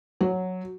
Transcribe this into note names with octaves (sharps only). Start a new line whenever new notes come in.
F#3